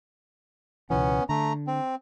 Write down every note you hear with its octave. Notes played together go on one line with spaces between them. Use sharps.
C#2 B2 E3 B3 C#4
D3 A3 A#5
C4